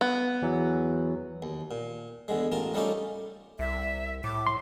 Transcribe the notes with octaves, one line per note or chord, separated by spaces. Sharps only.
B3
E2 E3 F#3
D#2
A#2
E2 D3 G#3
A1 F4 A#4 A5
G3 A3 C#4 D#4 F4 G4
C2 E5
A2 D6
C6